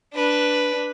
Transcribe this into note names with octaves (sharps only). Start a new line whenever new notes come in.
D4 B4